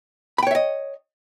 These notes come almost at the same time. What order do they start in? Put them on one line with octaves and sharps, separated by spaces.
B5 G5 C#5 E5 D#5